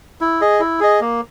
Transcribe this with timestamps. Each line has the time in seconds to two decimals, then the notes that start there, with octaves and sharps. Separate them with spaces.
0.21 E4
0.41 G#4 D#5
0.60 E4
0.80 G#4 D#5
1.01 A#3